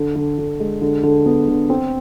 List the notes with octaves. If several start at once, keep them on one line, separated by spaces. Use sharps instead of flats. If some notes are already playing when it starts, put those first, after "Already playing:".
Already playing: D3
D3
D3
G#3
D3
D3
B3
D3
C4